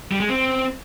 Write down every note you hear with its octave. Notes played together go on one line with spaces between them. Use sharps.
G3
G#3
C4